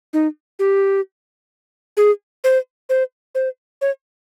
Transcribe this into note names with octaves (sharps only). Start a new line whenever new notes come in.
D#4
G4
G#4
C5
C5
C5
C#5